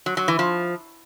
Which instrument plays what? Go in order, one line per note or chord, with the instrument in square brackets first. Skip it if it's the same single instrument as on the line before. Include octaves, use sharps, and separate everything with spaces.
[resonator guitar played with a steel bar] F#3
F#3
E3
F3